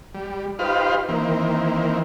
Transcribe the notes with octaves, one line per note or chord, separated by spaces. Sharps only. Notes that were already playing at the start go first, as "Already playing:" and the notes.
G3
D#4 F4 G4 B4 C5 F5
D#3 E3 A#3 C4